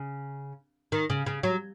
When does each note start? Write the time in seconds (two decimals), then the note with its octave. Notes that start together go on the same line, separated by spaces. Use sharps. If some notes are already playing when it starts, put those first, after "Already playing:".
Already playing: C#3
0.92 D#3
1.10 C#3
1.26 C#3
1.43 F#3